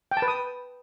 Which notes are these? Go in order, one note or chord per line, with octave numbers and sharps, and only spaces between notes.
G5
A5
B4
D#6